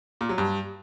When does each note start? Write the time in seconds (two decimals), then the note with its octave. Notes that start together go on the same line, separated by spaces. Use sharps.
0.21 A#2
0.29 F#3
0.38 G2